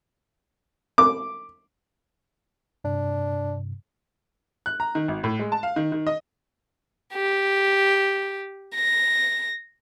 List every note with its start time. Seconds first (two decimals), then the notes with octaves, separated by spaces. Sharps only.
0.98 D6
2.84 G2 C3 D4
4.66 F#6
4.80 A#5
4.95 D#3
5.08 G#1
5.24 A2
5.39 G#3
5.52 A5
5.63 F5
5.76 D#3
5.92 D#3
6.07 D#5
7.13 G4
8.76 A#6